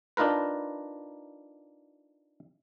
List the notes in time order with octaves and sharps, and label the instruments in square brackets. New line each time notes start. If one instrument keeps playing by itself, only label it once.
[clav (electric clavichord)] D4 D#4 F4 A#4 B4